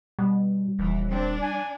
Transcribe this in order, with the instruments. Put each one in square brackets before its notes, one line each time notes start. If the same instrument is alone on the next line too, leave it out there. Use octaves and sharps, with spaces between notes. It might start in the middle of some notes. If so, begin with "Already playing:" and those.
[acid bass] B2 [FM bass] G3
[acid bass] D#1 [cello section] E3
[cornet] C4 [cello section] D4
[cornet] G#5